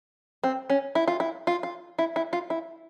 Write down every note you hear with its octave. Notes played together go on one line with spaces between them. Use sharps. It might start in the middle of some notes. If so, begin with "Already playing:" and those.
C4
C#4
E4
F4
E4
F4
F4
E4
E4
F4
E4